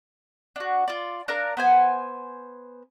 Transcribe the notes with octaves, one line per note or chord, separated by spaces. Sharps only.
D4 F#4
F4 D5
D4 A#4 F5 A#5
B3 C5 G#5